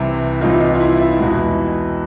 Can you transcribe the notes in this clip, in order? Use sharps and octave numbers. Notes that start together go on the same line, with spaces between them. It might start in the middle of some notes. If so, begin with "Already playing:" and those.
Already playing: C2 C3 E3 E4
C2 C3 E3 D#4 F4
D#4 F4
F4
E4
E4
E2 B2 G#3 E4